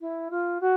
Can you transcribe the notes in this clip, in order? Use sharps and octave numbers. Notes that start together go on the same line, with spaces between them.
E4
F4
F#4